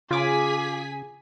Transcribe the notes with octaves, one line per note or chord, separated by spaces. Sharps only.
C#3 F4 G#4 G#5 D6 B6